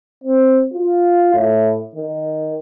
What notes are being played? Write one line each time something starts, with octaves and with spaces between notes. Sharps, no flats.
C4
F4
A2
D#3